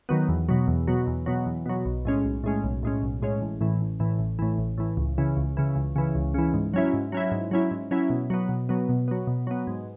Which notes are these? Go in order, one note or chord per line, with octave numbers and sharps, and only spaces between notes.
D#3 F#3 B3
E2
B2 F#3
E2
B2 F#3
E2
B2 F#3
E2
B2 F#3
B1
A2 G#3 C#4
B1
A2 G#3 C#4
B1
A2 G#3 C#4
B1
A2 G#3 C#4
A1
A2 E3
A1
A2 E3
A1
A2 E3
A1
A2 E3
C#2
C#3 E3
C#2
C#3 E3
C#2
C#3 E3
C#2
C#3 E3
G#2
F#3 C#4 E4
G#2
F#3 C#4 E4
G#2
F#3 C#4 E4
G#2
F#3 C#4 E4
B2
F#3 B3
B2
F#3 B3
B2
F#3 B3
B2
F#3 B3
G#2